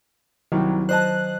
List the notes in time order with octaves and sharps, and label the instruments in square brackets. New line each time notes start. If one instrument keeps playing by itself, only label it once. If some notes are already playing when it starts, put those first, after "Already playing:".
[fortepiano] C2 [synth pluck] D#3 F#3
[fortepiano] C5 D#5 A5 [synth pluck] F#6